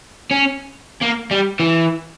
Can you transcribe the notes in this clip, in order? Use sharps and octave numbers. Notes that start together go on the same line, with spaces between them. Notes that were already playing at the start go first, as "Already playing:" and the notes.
C#4
A#3
G3
E3